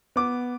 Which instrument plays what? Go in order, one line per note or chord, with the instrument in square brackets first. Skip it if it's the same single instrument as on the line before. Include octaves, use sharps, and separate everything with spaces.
[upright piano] B3 D6